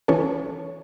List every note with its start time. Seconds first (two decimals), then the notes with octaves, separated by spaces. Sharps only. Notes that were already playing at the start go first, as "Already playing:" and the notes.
0.08 E3 C#4 A4 C#5